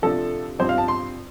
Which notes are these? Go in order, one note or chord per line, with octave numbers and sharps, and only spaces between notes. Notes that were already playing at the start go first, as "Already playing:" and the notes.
C3 F3 A3 D4 A4
G2 F3 C4 C5
F5
A5
C6